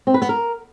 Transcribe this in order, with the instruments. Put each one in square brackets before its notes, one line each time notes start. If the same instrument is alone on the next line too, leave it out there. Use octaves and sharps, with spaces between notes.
[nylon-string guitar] C4
B4
B3
A#4